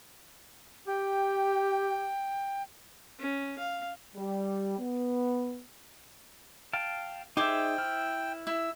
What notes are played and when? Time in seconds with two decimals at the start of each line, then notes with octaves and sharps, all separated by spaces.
0.88 G4 G5
3.20 C#4
3.58 F5
4.15 G3
4.78 B3
6.73 F5 G5 A5
7.37 D#4 G#4 C5 E5 G5 D6
7.78 E4 F6
8.47 E4 E6